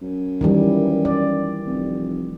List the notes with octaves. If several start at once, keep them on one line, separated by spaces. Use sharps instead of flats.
F#2
D#3 E3 G3
D5
F1